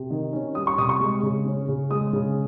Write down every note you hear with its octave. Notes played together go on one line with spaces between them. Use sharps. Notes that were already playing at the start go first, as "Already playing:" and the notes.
Already playing: C3
D#3
C#4
G3 D#6
C#6
C3 D#6
C#6
G#3
C#3
C#4
C#3
G#3 D#6
C#3